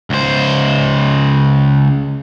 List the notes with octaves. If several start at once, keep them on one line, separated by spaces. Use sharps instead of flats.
C#2 C5